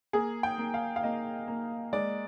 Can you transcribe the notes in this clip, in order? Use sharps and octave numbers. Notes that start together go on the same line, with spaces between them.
A#3 G#4
G5
A#3
F5
F5
A#3 D#5
A#3
G#3 D5